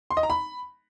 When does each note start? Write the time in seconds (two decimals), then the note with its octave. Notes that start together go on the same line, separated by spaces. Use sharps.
0.10 C6
0.17 D#5
0.23 A#5
0.30 B5